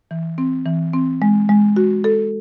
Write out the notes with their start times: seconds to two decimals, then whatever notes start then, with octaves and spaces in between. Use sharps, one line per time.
0.11 E3
0.38 C4
0.66 E3
0.93 C4
1.22 G#3
1.49 G#3
1.76 F#4
2.04 A4